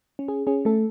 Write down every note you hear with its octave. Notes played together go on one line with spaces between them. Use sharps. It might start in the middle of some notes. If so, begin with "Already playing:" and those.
C#4
G#4
C#4 G#4
A3 A4